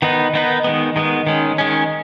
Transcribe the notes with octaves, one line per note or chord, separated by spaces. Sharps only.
D#3 B3 D#4 B4
D#3 B3 D#4 B4
D#3 G#3 B3
D#3 G#3 B3
D#3 G#3 C#4
D#3 G#3 C#4